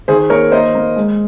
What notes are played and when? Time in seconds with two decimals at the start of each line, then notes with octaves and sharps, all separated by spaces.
0.08 D#3 G#4 C5
0.30 A#3 A#4 C#5
0.52 A#3 C5 D#5
0.75 A#3
0.96 G#3